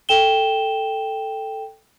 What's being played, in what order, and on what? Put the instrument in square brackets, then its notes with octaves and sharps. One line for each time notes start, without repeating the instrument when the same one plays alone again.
[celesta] A4 G5 E7 G7